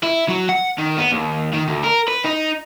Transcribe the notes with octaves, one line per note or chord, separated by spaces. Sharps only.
E4
F#3
F#5
D#3
B3
D#2
D#3
D2
A#4
B4
D#4